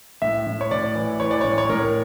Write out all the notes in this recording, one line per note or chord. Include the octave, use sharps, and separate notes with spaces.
A2 E5
A2
C#5
A2 D5
E3
E3 C#5
D5
A2 C#5
C#5
A2 A#4